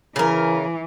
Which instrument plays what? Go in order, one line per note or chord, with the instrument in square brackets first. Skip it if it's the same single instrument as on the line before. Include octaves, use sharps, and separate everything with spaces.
[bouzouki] C#3 A#4 [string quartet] E3